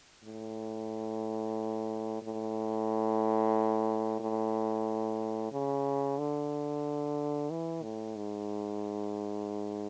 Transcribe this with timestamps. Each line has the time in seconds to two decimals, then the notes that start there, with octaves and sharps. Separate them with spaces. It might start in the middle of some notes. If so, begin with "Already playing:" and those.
0.24 A2
2.22 A2
4.20 A2
5.52 C#3
6.18 D3
7.50 E3
7.82 A2
8.16 G#2